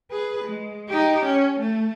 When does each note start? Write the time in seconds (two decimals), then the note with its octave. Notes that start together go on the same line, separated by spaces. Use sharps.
0.11 G#4 B4
0.44 G#3
0.89 D#4 G4
1.25 C#4
1.60 A3